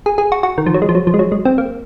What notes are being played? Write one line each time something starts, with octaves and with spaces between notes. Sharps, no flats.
G#4
G#4
F#4
F#4
D#3
F3
F#3
G#3
F3
F#3
F3
G#3
F#3
G#3
C4
A#3